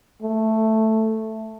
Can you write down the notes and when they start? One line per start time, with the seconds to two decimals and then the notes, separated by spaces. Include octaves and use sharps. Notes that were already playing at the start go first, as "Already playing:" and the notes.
0.22 A3